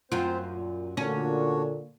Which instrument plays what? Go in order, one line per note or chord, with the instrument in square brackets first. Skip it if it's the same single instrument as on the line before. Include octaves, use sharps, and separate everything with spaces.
[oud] F#2 F4 [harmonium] C4 C5
[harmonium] A#2
[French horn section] A#2 D3 [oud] C#4 [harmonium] D4 F#4 C#5